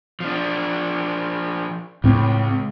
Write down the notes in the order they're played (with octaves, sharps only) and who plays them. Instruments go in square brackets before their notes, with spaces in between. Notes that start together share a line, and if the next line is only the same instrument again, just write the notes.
[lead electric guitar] F3 D4
[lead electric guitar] C#2 [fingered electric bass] A2 C4